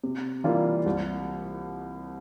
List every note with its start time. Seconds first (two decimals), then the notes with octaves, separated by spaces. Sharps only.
0.03 C3
0.44 E3 G3 A#3 F4
0.86 C2